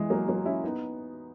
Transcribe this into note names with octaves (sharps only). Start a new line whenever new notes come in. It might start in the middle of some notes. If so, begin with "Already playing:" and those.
Already playing: E3 G#3
F#3 A#3
F#3 A#3
C#4 E4
B3 D#4